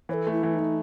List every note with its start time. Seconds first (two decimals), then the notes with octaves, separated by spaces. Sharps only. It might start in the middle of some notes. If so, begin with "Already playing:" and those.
0.09 E3 C#5
0.13 A4
0.27 A3 E4
0.43 E3
0.54 D#4
0.59 E3